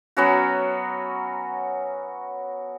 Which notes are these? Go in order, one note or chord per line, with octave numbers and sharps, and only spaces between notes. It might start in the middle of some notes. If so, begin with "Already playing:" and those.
F#3 B3 C#4 F#4